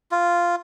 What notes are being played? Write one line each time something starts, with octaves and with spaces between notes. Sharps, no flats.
F4